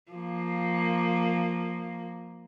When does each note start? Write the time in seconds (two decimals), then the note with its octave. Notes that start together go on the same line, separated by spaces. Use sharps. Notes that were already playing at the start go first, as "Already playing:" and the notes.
0.12 F3 A#3